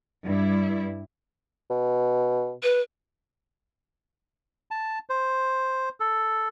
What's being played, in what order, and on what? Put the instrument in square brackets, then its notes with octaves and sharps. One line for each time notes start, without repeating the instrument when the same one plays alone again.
[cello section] G2 E4
[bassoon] B2
[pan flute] B4
[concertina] A5
C5
A4